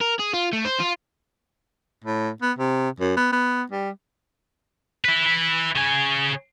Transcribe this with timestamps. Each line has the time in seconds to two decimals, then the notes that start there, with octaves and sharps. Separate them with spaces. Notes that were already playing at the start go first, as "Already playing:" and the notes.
0.01 A#4
0.19 G#4
0.33 F4
0.53 A3
0.65 C5
0.80 F4
2.04 A2
2.42 B3
2.58 C3
3.00 F#2
3.17 B3
3.32 B3
3.71 G3
5.05 E4 B4
5.76 C#3 G#5